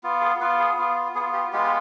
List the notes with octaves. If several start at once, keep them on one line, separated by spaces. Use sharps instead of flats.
B3 F4
G#4
B3 F4 B4
G#4
B3 F4
B3 G#4
F4
G4
G#3 B3 F4 G4
G4